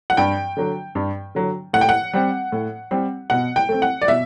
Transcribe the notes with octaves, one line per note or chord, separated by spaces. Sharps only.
F#5
G2 G5
D3 F#3
G2
D3 F#3
A2 F#5
G5
F#5
G3 C4
A2
G3 C4
B2 F#5
G5
A3 C4
F#5
D5
B2 E5